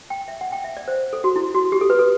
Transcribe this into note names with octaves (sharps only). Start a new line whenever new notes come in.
G5
E5
F#5
G5
E5
D5
C5
A4
F#4
E4
F#4
G4
A4
B4
A4